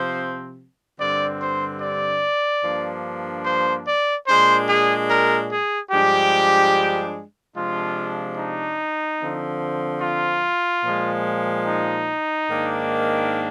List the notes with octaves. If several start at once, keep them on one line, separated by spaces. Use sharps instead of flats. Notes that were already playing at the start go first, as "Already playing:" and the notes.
Already playing: C3 F3 C4 C5
G2 D3 G3 C4 D5
C5
D5
G2 F3 A#3 D4
C5
D5
A#2 G#3 D4 C5
G#4
A#4
G#4
G2 F3 G#3 D4 G4
C3 F3 G#3 D4 F4
D#4
D3 F3 C4
F4
A#2 F3 G#3
D#4
G#2 D#3 A#3 D4